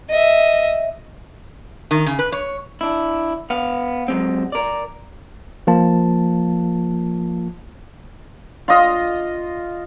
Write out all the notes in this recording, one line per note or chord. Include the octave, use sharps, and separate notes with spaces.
D#5 E5
D#3
C#3
B4
C#5
D4 E4
B3 F5
F#3 G#3 C4
A#4 D5
F3 A#3 F4 A5
F4 D#5